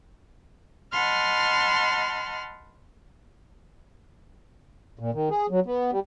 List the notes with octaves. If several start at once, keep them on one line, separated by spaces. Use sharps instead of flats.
D#5 F#5 A5 B5 C6 F6
A#2
D#3
G#4
F#3
B3
G3